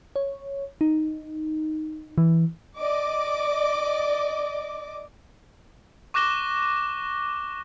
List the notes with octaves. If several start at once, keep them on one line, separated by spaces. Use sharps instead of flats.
C#5
D#4
E3
D5 D#5 D6
C#6 D6 F#6 A#6 E7 G7